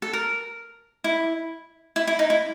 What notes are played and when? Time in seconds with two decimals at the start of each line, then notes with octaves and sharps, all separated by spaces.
0.02 A4
0.13 A#4
1.04 E4
1.96 E4
2.07 E4
2.19 D#4
2.30 E4